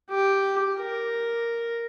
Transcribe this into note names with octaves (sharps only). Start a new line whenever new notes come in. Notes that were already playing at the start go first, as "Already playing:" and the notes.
G4
A#4